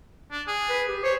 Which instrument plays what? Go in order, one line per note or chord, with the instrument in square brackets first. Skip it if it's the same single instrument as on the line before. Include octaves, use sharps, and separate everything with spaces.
[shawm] D4
G#4
[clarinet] B4
G4
[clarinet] C5 [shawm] C#5